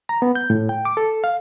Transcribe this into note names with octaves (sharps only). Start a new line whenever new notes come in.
A#5
B3
G6
A2
G5
D6
A4
F5